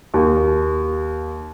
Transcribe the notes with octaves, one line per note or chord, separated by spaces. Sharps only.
D#2